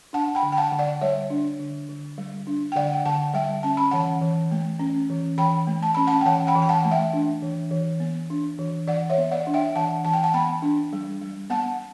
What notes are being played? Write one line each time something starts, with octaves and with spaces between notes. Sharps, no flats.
D4 F#5 A5
G5 B5
D3
G5
F#5 A5
D3
D5 F#5
G3 C#5 E5
D4
D3
D3
G3
D4
G5
D3 D5 F#5
G5
D3 F#5 A5
G3 E5 G5
C#4 A5
B5
E3 F#5 A5
E3
A3
C#4
E3
E3 G5 B5
A3
A5
C#4 B5
F#5 A5
G5
E3 F#5 A5
G5 B5
E3
G5
F#5 A5
A3
E5 G5
D4
E3
E3
B3
D4
E3
E3 D5 F#5
C#5 E5
B3
D5 F#5
D4
E5 G5
E3 F#5 A5
E3 A5
G5
F#5 A5
B3 G5 B5
D4
G3
G3
B3 F#5 A5